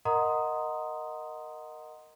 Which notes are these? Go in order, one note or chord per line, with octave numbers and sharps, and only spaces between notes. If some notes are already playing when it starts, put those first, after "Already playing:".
A#4 D#5 F#5 A#5 C6 D#6